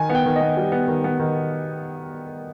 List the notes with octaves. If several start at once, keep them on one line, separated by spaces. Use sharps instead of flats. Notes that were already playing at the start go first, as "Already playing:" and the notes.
Already playing: D#3 G#5
B3
G5
D#3
B3 D#5
G3
B3
D#3
B3
D#3